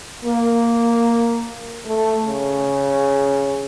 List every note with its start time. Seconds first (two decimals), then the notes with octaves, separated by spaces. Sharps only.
0.25 A#3
1.86 A3
2.26 C#3